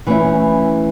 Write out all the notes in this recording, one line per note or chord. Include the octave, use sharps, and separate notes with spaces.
E3 A3 C#4 E4